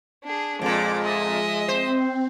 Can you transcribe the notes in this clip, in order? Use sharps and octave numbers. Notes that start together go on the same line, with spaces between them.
D4 G#4
F2 A#2 F3 G#3 D6
D#5 E5
C4 C5